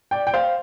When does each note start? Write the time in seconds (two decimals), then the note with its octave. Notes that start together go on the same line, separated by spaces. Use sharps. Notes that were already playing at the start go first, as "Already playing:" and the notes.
0.11 D5 G5
0.27 G5
0.34 C5 F5